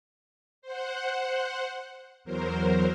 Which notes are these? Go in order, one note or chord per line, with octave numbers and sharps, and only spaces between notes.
C5 F#5
E2 F#3 A#4 C5